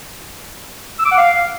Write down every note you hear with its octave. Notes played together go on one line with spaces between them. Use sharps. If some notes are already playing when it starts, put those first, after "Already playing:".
E6
D6
F#5
F5